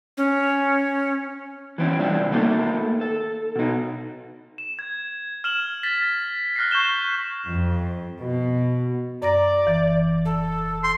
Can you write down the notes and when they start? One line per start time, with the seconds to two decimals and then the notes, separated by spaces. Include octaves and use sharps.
0.17 C#4
1.78 E3 C4 C#4 E4
1.99 C3 G3 C4 D4 E4 F4
2.31 D#3 A3 A#3 D#4 A4
3.01 A4
3.56 B2 D#4
4.58 E7
4.79 G#6
5.44 F6 E7 F#7
5.83 A6 B6
6.56 F6 F#6 A#6 C7
6.71 C#6 G6 E7 G7
7.49 F2
8.20 B2
9.22 F#2 D5 A#5 A#6
9.67 E1 E3
10.25 A4
10.83 C6